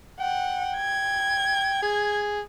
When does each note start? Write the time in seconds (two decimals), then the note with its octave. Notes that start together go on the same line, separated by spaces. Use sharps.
0.20 F#5 G5
0.77 G#6
1.82 G#4